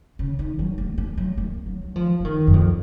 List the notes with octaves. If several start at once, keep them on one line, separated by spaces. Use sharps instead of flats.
C#3
D#3
F#3
A#3
A#3
F#3
A#3
F#3
F#3
F3
F3
D#3
F#2
F2